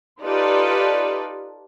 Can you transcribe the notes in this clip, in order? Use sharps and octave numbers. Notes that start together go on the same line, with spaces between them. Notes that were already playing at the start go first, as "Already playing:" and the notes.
D#4 F4 G4 A4 B4 D5